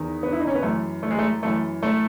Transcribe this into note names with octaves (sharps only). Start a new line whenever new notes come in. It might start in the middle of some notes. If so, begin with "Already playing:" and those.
Already playing: E2 D#3
B3
E4
D#4
C#4
B3
F#2 E3 A3
A3
G#3
A3
F#2 E3 A3
A3